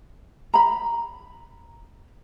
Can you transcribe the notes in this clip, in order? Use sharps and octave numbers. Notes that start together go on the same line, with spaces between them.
A#5 B5